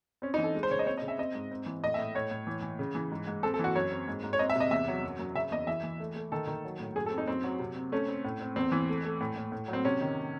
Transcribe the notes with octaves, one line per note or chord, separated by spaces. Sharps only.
C4 C#4
D#4
E3
A4
G#3
C5
C#3 C#5
D#5
C4 C#5
D#5
C#3
E5
C4 D#5
G#2
C4
E3
A2 D#5
E5
A2
A2 C#5
A2
E3
E3
C#3
E3
G#2
G#2
C4 A4
A4
E3 F#4
F#2 C#5
C4
G#2
G#2
C#5
C4 D#5
E5
C3
D#5
E2 E5
F#3
F#2
F#2
C#3 E5
E2 D#5
E3 E5
E3
A3
A3
D#3 A4
D#3
F#3
A2
F#2 G#4
A4
C4
D#4
F#2 C4
F#3
C3
C4
A3 C#4
C4
A2
C4
E2 C4
E3
A3
A3
A2
A2
A2
F#3
C4
C3 C#4
D#3